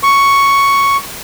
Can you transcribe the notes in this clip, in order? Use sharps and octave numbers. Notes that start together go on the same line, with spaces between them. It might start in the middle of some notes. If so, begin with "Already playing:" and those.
C#6